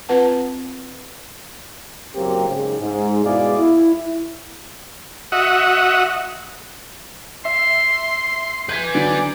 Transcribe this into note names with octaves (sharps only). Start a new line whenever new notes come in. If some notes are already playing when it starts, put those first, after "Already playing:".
C4 F4 B4 F#5 A5
F#1 F#3 A#3 C4 G4
G#2 C#3
G#2
B2 G#3 E4 G#4 D5 F5
E4
F#4 D#5 E5 F#5
E5 C6
B4 G#5 G6 G#6 B6
D3 F#3 D5